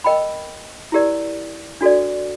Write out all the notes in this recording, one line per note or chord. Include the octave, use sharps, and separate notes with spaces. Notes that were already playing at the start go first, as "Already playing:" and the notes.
A#4 D#5 G5 B5
E4 G4 A#4 D5
D4 F#4 A4 D5